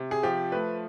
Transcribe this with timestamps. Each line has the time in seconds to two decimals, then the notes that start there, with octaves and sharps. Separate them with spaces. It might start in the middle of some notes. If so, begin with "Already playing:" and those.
Already playing: C3
0.11 G#4
0.23 F3 G4
0.52 A3 B4